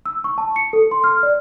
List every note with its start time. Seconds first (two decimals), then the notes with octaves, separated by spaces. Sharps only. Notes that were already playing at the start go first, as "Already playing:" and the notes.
0.06 E6
0.24 C#6
0.38 A5
0.56 C#7
0.73 A4
0.91 C6
1.04 F6
1.23 D5